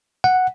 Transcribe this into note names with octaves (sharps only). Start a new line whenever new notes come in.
F#5